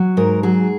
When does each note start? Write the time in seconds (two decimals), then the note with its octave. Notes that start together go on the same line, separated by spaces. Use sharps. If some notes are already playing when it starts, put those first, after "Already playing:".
Already playing: F#3
0.17 G#2 A#4
0.43 F#3 G#4